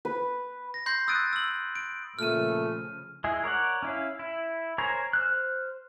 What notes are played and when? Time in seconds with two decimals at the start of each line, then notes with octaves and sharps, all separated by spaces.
0.05 B4
0.74 A#6
0.86 B5 C6 G6 A#6 C7
1.08 D#6 E6 F#6 A6 D7 D#7
1.33 E6 F#7
1.75 D7
2.19 A#2 C#3 F3 A3 F6 D#7
3.24 G#3 E4 G#4
3.44 A#4 C#5 D5 F#5
3.83 C#4 E4 F5
4.19 E4
4.78 A#4 C5 C#5 G#5 A#5
5.13 C5 F6 F#6